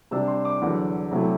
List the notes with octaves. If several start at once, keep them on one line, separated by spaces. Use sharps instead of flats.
C3 G3 D4 E6
C6
D6
E2 D3 F#3
C3 F#3 A3 E4